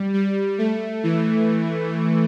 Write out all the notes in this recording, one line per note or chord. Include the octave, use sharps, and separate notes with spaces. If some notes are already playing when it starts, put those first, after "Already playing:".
Already playing: G3
G3
A3
E3